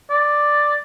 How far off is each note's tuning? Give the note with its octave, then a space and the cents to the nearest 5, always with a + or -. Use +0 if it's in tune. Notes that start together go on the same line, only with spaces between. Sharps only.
D5 +5